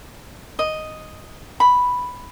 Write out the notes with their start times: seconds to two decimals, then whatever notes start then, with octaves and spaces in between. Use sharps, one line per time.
0.59 D#5
1.60 B5